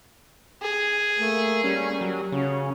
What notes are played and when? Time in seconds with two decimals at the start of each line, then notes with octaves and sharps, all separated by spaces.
0.62 G#4
1.19 A3 A#3
1.64 G3 C#4
2.01 F#3
2.32 C#3 F#3 C#4